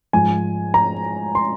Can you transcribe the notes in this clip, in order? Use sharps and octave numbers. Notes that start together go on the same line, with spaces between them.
G#2 F3 G#5
A#5
C6